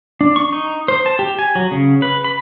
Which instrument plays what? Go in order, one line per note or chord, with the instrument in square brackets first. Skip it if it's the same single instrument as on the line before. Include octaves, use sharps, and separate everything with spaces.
[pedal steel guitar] D4
C#6
D#4
C5
A5
G4
G#5
F#3
C#3
B4
B5